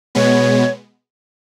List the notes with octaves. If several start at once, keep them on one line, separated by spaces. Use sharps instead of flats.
B2 G#3 B3 C#5